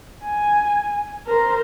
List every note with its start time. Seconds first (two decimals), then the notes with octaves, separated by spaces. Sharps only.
0.24 G#5
1.27 A#4 C5